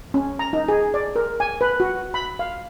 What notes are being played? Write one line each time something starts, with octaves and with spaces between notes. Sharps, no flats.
C#4
A#5
D#4
G#4
D5
A#4
G#5
B4
F#4
B5
F5